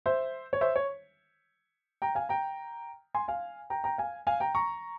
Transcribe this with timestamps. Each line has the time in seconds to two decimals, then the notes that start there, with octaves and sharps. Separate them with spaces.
0.06 C5 E5
0.53 C#5
0.61 C5 E5
0.76 C#5
2.02 G5 A#5
2.15 F5 G#5
2.29 G5 A#5
3.15 G#5 C6
3.28 F5 G#5
3.70 G5 A#5
3.84 G5 A#5
3.98 F5 G#5
4.27 F5 G#5
4.40 G5 A#5
4.55 A#5 C#6